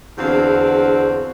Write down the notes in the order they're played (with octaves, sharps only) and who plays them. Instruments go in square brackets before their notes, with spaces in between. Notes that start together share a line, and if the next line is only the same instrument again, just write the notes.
[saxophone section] E2 D3 C4 F#4 G#4 F5